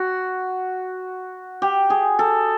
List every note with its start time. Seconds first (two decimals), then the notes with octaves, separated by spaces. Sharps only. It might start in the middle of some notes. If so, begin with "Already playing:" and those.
Already playing: F#4
1.62 G4
1.90 G#4
2.19 A4